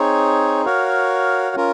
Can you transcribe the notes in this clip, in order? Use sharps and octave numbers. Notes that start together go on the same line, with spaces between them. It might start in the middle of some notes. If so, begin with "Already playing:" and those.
Already playing: C4 D#4 G#4 C#5
F#4 A#4 C#5 F5
C#4 F4 A#4